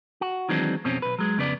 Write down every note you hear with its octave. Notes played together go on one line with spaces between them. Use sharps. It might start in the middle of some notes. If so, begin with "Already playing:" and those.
F#4
D#3 E3 F#3 G#3 C4 D4
F2 B2 C4 C#4
B1 B4
F#3 G#3
F2 C#3 B3 D5